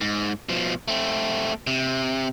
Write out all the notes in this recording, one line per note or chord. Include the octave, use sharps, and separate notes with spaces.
G#2
B2 F3
A3 C4
C3